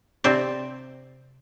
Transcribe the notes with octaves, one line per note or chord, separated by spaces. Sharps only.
C3 C4 C5 D5